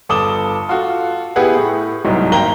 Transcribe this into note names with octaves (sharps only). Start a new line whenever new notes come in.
G1 A4 D6 D#6 E7 G7
F4 F#4 A4
B3 E4 G4 G#4 B4 F#5
A2
C2 G#2 B2 F#3
G#1 A#3 G5 A#5 G7